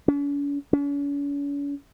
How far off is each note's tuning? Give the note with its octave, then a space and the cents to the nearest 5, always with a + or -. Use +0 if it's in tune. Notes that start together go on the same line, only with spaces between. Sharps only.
C#4 +45
C#4 +45